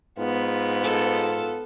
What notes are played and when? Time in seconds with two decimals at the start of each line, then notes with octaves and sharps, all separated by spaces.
0.19 G#2 B3 F4
0.83 A4